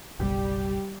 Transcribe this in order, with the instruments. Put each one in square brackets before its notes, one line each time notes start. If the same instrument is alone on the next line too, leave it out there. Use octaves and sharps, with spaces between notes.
[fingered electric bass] F#1 B1 [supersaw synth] G3 G4